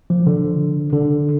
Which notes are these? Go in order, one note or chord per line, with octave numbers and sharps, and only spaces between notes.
F3
D3
D3